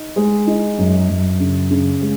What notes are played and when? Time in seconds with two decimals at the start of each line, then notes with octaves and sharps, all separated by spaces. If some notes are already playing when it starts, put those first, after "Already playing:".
Already playing: D#4
0.16 G#3
0.47 D#4
0.78 F#2
1.09 F#2
1.40 C#3
1.71 C#3
2.02 G#3